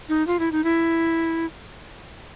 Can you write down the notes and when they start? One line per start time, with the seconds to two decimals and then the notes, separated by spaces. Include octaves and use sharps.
0.09 D#4
0.27 F4
0.40 E4
0.52 D#4
0.64 E4